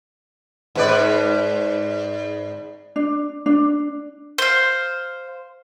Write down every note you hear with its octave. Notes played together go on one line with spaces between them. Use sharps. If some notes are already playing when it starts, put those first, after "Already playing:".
G#2 B4 D5
D4
D4
C5 F5